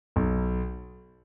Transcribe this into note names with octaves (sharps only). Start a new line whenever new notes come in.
B1